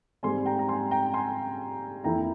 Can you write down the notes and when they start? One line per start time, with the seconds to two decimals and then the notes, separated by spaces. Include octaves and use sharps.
0.23 G#2 G3 C4 G#5 C6
0.46 G5 A#5
0.59 A#5
0.69 G#5 C6
0.91 G5 A#5
1.14 G#5 C6
2.04 F2 E3 A#3 E4 G5 A#5